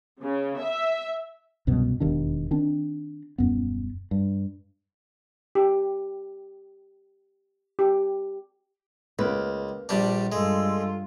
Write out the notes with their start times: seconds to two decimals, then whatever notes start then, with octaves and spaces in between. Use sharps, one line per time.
0.23 C#3
0.63 E5
1.67 C2 F#2 B2
2.00 E1 D#2 D#3 D4
2.51 D#3 C4 D4
3.38 D#1 F#2 B3
4.11 G2
5.55 G4
7.79 G4
9.19 C#2 A#3 B4
9.89 A#1 G3 D4
10.32 G2 G#3 F4 A4